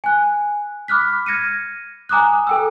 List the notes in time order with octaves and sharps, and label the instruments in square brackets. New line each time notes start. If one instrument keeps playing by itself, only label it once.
[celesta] G#5 F#6
B5 D6 F6 F#6 B6
F6 G#6 A#6 C#7 D#7
G#5 A#5 D6 D#6 F#6
A4 G5 E6